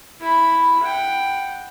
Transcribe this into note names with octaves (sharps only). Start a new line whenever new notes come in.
E4 B5
F#5 G5